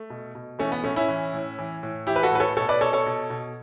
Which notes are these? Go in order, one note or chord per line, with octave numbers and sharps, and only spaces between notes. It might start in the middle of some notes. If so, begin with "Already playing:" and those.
Already playing: A3
B2
B2
E3 A3 C#4
B3
A2 A3 C#4
C#4 E4
E3
A2
E3
A2
E3 E4 G4
B4
F#4 A4
A2 B4
A4 C#5
B2 A4 C#5
B4 D5
B2 A4 C#5
A4 C#5
B2
B2